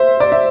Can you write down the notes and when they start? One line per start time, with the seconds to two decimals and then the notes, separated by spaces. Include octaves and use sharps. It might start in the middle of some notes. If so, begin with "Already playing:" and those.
Already playing: C5 E5
0.20 D5
0.32 E5